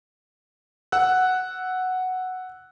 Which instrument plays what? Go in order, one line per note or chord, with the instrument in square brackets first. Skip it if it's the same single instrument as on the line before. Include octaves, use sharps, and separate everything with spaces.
[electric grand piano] F#5 E6 F#6